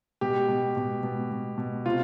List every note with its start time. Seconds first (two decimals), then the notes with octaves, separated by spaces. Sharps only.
0.21 B2 G4
0.49 B2
0.77 B2
1.03 B2
1.31 B2
1.58 B2
1.86 C3 F4